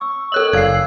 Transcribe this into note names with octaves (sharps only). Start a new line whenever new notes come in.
C#6 E6
A4 A#4 C#5 D#5 E6 F#6 F#7
F#1 G#4 D5 F5 G#6 C7